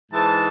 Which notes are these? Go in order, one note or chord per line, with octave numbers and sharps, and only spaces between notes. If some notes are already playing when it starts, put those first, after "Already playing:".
G#2 E3 A5